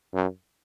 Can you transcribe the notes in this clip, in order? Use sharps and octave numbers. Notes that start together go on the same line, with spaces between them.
F#2